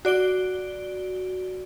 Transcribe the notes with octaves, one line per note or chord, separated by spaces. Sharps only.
F#4 D5 D7 G7